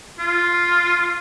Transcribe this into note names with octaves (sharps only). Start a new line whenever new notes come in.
F4